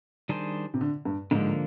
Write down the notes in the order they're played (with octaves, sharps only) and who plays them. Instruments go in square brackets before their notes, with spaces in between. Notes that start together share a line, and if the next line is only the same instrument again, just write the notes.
[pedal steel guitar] D#3 G3 D4 G#4 C5
[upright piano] C3
D3
G2
[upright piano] G#2 [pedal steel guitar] D3 F3 A#3